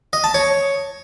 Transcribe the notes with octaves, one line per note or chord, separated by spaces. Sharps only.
D#5
A5
C#5